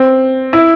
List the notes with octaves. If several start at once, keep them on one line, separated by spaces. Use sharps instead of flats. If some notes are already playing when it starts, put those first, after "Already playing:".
Already playing: C4
E4